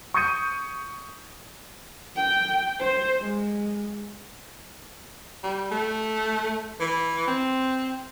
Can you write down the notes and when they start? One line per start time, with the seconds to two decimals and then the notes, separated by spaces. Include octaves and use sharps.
0.14 C#6 D#6 G6 G#6 C#7 D#7
2.16 G5
2.80 C5
3.21 G#3
5.44 G3
5.71 A3
6.80 E3
7.28 C4